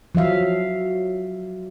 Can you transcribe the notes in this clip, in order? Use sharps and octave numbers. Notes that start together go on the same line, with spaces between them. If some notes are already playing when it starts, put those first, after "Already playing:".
F3 F#3 E5 F5